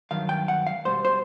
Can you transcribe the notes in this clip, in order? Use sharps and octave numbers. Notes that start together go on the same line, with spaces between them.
G2 D#3 F#3 F5
G5
F#5
F5
B2 G3 C5
C5